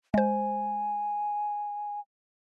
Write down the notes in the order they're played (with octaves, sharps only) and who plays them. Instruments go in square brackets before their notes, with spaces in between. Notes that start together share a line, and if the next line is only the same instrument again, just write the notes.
[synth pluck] G#3 C5 [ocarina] G#5